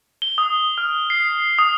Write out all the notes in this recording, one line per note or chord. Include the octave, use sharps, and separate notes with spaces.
G7
D#6
F6
C7
D#6